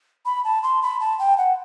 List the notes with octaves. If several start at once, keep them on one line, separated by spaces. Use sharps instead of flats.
B5
A5
C6
B5
A5
G5
F#5